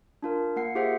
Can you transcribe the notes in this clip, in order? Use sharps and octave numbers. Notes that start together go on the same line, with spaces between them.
D4 F4 A#4
A#3 F#5 C7
F4 G4 G#4 C5 E5 F#5